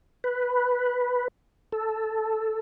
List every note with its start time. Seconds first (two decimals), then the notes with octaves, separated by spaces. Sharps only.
0.24 B4
1.72 A4